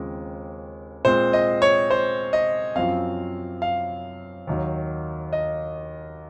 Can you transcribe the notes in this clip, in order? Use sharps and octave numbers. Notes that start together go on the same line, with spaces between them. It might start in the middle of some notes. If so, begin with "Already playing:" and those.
Already playing: D#2 C#3 F3 G#3 C4
A#2 G#3 C4 C5
D#5
C#5
C5
D#5
F#2 F3 C4 F5
F5
D#2 D#3 F#3
D#5